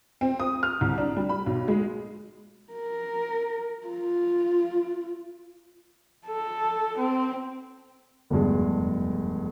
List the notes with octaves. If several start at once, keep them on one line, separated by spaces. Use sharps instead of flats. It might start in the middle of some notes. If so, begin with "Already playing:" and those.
C4
D#6
F6
C2
D4
G3
B5
B1
G#3
A#4
F4
A4
C4
F1 E2 G2 G#3